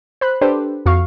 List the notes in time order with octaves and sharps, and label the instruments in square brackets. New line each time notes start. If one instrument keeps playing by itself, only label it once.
[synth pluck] C5 B5 F#6
D4 G4 A4 B4 C5
F2 F#4 F5 C#6